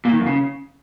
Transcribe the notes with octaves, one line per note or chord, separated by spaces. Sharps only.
A#2
D#3
F#2
C#3